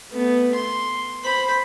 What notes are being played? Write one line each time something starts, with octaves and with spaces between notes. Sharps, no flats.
A3 B3
C6
C5 B5